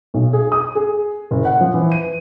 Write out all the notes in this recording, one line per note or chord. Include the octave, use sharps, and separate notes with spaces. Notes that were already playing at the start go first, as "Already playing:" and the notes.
B1
G#4
D#6
G#4
F#1
F#5
F3
E3
D#7